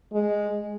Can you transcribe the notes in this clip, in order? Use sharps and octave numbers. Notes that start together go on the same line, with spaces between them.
G#3